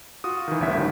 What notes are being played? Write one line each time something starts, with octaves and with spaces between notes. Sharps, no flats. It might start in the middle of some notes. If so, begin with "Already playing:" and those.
F4 F#4 D#6
D#3 E3
G1 D2 G2 C#4 E5 B6
G#2 D#3 F3 G3